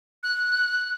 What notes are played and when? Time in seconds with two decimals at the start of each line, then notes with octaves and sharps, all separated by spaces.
0.23 F#6